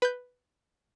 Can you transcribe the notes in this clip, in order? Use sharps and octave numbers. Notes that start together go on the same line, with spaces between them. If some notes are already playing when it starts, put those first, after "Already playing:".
B4 G6